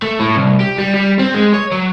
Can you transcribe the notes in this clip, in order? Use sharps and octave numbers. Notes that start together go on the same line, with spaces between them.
A3
A2
C2
G4
G3
G3
C4
G#3
C#5
F#3